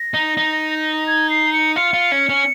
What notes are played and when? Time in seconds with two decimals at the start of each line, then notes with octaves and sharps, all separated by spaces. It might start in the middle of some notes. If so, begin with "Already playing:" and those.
Already playing: A#6
0.14 D#4
0.37 D#4
1.07 G#6
1.30 C7
1.53 C#7
1.76 F4 C#7
1.93 F4
2.12 C#4
2.29 C#4